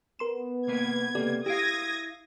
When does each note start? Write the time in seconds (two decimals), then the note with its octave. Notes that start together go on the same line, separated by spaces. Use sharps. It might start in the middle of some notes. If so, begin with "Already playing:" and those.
0.19 B3 A#4 C6 E7
0.67 C2 A#3 B4 G#6
1.15 C#2 C3 A#3 G4 A4 D5
1.46 E4 G4 F5 D#6 G#6 A#6 D7